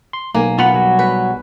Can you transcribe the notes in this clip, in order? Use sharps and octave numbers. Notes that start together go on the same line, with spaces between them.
C6
B1 A#3 G#5
B3 F4 F#5
F#3 G3 F#4
B4